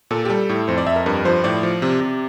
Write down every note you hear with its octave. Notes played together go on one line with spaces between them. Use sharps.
A#2 A4
G4
G3 A4
A2
F2 C5
D5
F2 E5
A#4
G2 A#4
F3 C5
A2 D5
F3
C3
C3